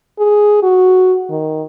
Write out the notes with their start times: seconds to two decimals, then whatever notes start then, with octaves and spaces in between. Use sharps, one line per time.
0.19 G#4
0.63 F#4
1.30 D#3